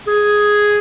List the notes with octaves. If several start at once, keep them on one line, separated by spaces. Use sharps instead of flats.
G#4